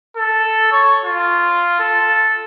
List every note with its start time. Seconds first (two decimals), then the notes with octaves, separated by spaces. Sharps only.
0.17 A4
0.72 C#5
1.05 F4
1.80 A4